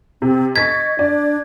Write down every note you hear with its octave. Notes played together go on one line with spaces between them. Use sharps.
C3 C4
D#5 C#6 G#6 A6 B6
D4 D5